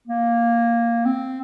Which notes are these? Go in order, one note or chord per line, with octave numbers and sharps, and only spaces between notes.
A#3
C4